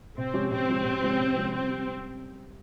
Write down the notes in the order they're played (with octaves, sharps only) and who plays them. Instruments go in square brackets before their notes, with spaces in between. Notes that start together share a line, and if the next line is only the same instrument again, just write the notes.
[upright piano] C3 [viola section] C4
[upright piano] F3 G#3 C#4 G4
[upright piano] C3 [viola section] C4
[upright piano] F3 G#3 C#4 G4
C3
F3 G#3 C#4 G4
C3
F3 G#3 C#4 G4
[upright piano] G3 [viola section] C4
[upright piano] G4